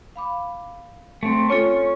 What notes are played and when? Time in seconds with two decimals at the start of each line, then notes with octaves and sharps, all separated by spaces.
0.16 F5 B5 D6
1.23 A3 C4
1.50 C4 C#4 F4 A4 C#6